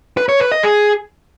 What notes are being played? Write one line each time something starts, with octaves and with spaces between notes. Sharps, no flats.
B4
C#5
B4
D#5
G#4